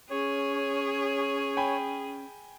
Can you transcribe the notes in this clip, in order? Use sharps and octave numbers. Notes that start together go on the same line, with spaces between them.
C#4 G#4 C#5
G5 G#5 B5